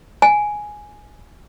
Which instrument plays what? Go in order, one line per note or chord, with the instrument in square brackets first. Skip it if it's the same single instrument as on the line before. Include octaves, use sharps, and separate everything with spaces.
[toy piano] G#5